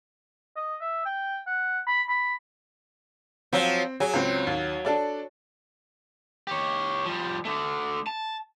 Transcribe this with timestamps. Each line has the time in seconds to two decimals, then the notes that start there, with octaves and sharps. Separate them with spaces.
0.57 D#5
0.81 E5
1.05 G5
1.47 F#5
1.87 B5
2.09 B5
3.53 F3 F#3 C4
4.00 F#3 G#4
4.14 C#2 C4
4.47 D#2
4.85 D4 A4 D5
6.47 G4 C#5
7.05 F3 G3
7.45 D3 A3
8.07 A5